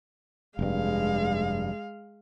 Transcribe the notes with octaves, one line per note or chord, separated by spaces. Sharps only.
F1 G2 G#3 F5